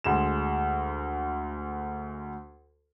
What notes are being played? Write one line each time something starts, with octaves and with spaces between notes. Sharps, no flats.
D2 G#3 E7